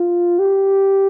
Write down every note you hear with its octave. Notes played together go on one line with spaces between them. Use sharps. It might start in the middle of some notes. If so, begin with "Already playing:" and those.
Already playing: F4
G4